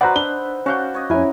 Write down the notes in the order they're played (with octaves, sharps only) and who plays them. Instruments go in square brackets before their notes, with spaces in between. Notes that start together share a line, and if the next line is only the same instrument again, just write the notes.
[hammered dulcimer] D#4 B4 E5 [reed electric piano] F#4 C5 D5 [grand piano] F#5 A#5
[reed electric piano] D4 [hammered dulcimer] C5 F#5 [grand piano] G7
[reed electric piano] C#4 F5 G6 [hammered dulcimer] D4 F#4
[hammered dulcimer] C#5 D#5
[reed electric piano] F2 G#5 [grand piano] C#4 E4 [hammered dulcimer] A#4